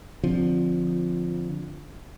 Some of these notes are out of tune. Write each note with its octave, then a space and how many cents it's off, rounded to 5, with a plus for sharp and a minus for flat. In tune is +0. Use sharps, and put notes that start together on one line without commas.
D3 +0 F3 +0 C4 +0